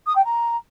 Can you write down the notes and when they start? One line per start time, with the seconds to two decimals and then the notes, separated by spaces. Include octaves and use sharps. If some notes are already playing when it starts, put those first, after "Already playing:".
0.06 D#6
0.15 G5
0.24 A#5